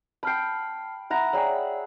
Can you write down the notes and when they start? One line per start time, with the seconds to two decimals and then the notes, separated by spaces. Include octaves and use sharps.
0.23 G5 A5 B5 F6 C7
1.10 E4 F#5 A#5
1.33 G#4 C#5 D5 E5 G5 B5